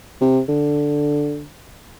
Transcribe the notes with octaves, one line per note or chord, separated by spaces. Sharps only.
C3
D3